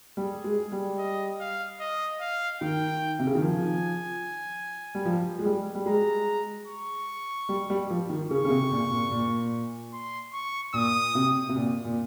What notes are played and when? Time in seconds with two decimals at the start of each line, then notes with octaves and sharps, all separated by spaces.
0.17 G3 G#4
0.44 G#3
0.72 G3
0.98 D#5
1.40 F5
1.80 D#5
2.21 F5
2.61 D#3 G5
3.19 C3
3.27 C#3
3.35 D#3
3.42 F3 G#5
4.95 G3
5.06 F3
5.39 G#3
5.45 G3
5.75 G3
5.86 G#3 A#5
6.68 C#6
7.49 G3
7.70 G3
7.90 F3
8.09 D#3
8.30 C#3 C#6
8.45 C#3
8.50 C3
8.71 A#2
8.91 A#2
9.11 A#2
9.93 C6
10.33 C#6
10.74 A#2 D#6
11.15 C3
11.49 C3
11.55 A#2
11.85 A#2